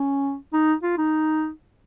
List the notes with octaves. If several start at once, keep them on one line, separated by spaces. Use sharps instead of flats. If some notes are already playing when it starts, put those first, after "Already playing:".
Already playing: C#4
D#4
F4
D#4